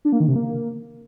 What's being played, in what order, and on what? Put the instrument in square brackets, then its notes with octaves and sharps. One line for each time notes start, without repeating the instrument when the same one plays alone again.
[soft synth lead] D4
A#3
D#3
C3
A#3